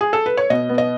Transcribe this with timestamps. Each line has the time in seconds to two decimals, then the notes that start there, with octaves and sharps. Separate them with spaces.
0.01 G#4
0.13 A4
0.26 B4
0.37 C#5
0.50 B2 D#5
0.69 B3
0.78 D#5